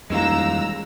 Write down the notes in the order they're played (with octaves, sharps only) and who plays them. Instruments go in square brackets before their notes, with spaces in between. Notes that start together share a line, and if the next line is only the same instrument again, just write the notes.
[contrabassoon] D#1 [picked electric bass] F2 D#3 E3 [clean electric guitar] G#3 F4 [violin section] A#5 E6